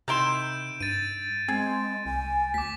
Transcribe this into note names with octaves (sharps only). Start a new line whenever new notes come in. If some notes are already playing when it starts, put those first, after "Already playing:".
C3 D#3 E4 C6 G6 D7 E7
G2 A6 D#7
G#3 C4 G#4
C2 G#5
D2 D6 B6